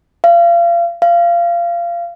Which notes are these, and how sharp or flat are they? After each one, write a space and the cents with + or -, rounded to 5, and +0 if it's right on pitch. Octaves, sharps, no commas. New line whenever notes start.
F5 -35
F5 -25